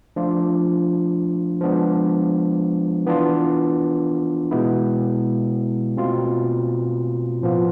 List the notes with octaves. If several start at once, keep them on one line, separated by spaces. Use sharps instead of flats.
F3 A3 D4 F4
F3 G#3 B3 D4
E3 B3 D4 F4
B2 G#3 B3 E4
B2 A3 C4 F4
A2 F3 B3 F4